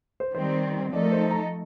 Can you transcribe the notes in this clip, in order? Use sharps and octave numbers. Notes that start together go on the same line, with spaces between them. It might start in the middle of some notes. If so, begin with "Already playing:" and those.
C5
D#3 G3 C4 C5
F3 A3 D#4 A4 D5
A#4
C5
A#5